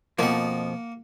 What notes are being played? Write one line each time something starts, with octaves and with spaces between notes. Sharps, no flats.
F2 B2 F3 A#3 F#5